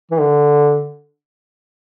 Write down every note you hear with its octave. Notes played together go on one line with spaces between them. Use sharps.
E3
D3